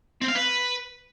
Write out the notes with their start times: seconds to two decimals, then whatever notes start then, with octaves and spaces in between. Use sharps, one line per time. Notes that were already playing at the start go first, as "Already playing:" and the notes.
0.21 C4
0.28 F5
0.35 B4